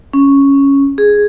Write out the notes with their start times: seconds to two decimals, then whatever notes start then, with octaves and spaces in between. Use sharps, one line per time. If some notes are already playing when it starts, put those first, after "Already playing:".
0.13 C#4
0.98 G#4